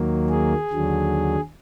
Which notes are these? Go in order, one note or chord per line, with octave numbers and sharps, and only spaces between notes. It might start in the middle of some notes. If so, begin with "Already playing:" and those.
Already playing: D#2 D#3 F#3 A#3
G#4
D#2 D3 F#3